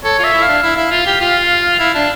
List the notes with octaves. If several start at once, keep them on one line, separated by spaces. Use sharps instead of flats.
A4 C#5
F4 E5
E4
F5
D4
E4 F5
E4
F4
G4
F4
E4
D4